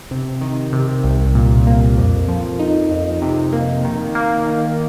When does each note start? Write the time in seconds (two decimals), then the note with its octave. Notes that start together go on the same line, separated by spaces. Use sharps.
0.11 C3
0.41 D#3
0.73 C3
1.04 C2
1.35 A#2
1.67 A#3
1.98 F2
2.28 F3
2.59 D#4
2.91 F2
3.22 C3
3.53 A#3
3.85 D#3
4.15 A#3
4.46 D#3